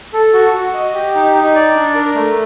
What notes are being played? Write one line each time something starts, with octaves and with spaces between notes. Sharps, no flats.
A4
F#4
F#4
D#5
G4
D#4
D#4
D5
D4
A#4
A3